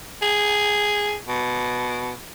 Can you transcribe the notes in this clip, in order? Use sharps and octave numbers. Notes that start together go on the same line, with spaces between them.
G#4
B2